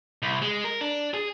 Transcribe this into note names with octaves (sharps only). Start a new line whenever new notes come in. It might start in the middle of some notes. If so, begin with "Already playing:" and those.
C2
G#3
A#4
D4
G#4